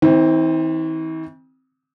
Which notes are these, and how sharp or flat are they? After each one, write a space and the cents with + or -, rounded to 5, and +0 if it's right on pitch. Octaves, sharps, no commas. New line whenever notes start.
E3 -45 C4 +0